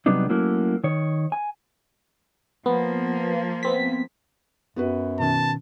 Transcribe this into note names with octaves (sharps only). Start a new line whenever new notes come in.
C3 F#3 G3 B3 D4 D#4
F#3 A3 A#3 C#4 E4 F#4
D#3 C#5
G#5
F3 A#3 B3
B3 C4 B6
F#2 B3 F#4 B4
B2 D#3 C#4 A5